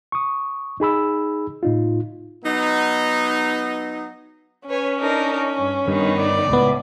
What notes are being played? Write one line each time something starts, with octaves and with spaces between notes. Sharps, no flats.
C#6 D#6
D#4 G#4 B5 E6
A2 D#4 F4
F#3 B3 D#4
C#4 B4 C#5 G#5
D4 D#4 A#4
G2
G2 D#3 B3 D#4
D5
C#2 A2 B3